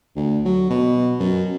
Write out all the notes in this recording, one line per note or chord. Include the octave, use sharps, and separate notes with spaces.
D2
F#3
B2
F#2